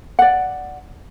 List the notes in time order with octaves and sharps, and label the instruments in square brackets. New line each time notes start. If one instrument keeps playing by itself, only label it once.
[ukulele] D5 F#5